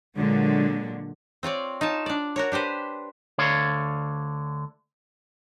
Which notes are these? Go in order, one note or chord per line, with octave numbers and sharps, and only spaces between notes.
A#2 D3 F#3 G#3
C4 F4 C#5 D5
D#4 F4 C#5 A5
D4 D5
F#4 A#4 C#5
D4 G4 B4 C5
D2 D3 C#5 F5